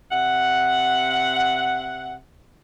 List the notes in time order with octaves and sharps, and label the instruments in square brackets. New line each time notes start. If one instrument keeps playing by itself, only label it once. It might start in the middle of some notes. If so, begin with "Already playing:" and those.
[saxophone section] C3 E5 F#5